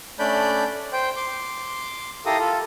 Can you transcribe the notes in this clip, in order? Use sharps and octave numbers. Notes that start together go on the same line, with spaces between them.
A3 C#4 D4 D5 B5 G6
C5 G5
C6 D6
E4 G4 A4 A#4 F5 D#6
F4 A4